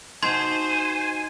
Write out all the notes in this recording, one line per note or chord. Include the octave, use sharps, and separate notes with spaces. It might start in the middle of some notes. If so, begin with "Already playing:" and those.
D#4 F#4 C5 G#5 A5 C6 G#6